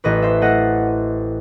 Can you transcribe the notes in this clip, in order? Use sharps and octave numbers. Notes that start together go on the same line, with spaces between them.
A1 B4 D#5
C5 E5
A3 D#5 F#5